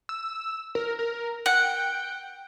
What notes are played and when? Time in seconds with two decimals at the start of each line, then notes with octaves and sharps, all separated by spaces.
0.09 E6
0.75 A#4
0.99 A#4
1.46 F#5 G5